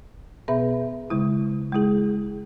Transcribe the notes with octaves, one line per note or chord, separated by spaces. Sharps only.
B2 B3 G#4 B4 E5
C#3 G#3 E4
G#3 E4 G#4